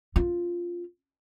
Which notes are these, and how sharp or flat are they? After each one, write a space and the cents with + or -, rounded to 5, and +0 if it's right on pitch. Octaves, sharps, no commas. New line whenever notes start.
C#4 -20 F4 +0